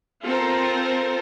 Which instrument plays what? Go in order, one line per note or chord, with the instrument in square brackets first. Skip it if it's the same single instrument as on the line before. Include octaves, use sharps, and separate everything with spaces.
[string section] C4 F4 A4 A#4 C5